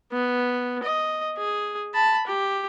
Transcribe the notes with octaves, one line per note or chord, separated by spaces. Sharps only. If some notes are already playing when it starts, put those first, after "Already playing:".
B3
D#5
G#4
A5 B5
G4